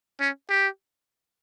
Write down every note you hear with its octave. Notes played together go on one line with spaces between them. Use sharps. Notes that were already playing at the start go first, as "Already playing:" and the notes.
C#4
G4